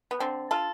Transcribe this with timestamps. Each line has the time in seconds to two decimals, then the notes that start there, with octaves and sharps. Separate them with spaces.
0.11 B3
0.20 D3 C4
0.51 F4 A4